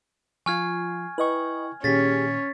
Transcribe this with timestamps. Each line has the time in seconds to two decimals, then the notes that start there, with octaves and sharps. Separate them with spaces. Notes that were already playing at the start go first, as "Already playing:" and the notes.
0.46 F3 F4 G#5 C#6 F6 G#6
1.18 E4 B4 D#5 G5 C#6
1.84 A#2 D#3 C#4 G4 G#4 A6 B6